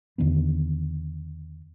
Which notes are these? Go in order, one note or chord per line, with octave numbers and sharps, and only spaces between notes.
E2 D3 D#3 B3